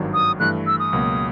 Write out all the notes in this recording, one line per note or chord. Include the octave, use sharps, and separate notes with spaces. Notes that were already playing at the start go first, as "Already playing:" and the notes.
Already playing: G#1 G2 D#3 F#3
D#6
G2 E3 A3 F#6
E6
D#6
C#2 B2 F#3 A#3